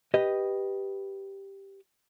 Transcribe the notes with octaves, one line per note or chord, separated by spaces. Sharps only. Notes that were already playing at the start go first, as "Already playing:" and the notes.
G4 B4 D#5